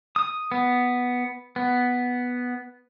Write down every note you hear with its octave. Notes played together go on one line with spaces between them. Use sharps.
D#6
B3
B3